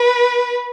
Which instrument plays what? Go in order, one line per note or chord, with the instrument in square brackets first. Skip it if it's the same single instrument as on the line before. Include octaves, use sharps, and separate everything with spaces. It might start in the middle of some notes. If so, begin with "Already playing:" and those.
Already playing: [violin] B4